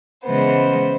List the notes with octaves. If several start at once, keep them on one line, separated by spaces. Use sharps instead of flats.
C#3 E3 G#3 B3 C5